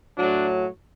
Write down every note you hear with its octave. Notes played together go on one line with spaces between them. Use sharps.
A2 F#3 D4